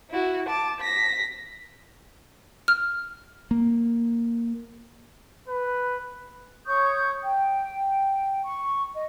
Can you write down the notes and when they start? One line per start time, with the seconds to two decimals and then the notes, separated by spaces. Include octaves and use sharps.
0.10 E4 F#4
0.49 A5 D6
0.81 A#6 B6
2.68 F6
3.51 A#3
5.48 B4
6.66 C#5 C#6 D#6 G6
7.23 G5
8.43 C#6
8.94 D#5